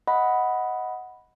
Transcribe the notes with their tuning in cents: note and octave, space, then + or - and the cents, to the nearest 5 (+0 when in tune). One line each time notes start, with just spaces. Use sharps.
D#5 +15 F#5 +0 B5 +0